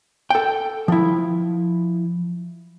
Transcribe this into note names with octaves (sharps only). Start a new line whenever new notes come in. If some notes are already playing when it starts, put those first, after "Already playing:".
A4 G5
F3 E4